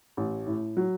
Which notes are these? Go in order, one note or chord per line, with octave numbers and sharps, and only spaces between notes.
A1
A2
F#3